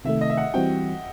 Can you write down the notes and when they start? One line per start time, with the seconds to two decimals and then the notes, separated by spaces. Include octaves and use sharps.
0.05 C3 D#3 A3 E5
0.21 D#5
0.30 E5
0.37 F#5
0.54 E3 G3 C4 F#4 G5